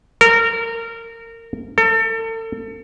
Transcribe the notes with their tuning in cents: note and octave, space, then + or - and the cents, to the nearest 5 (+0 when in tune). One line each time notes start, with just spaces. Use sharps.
A#4 -25
A4 +35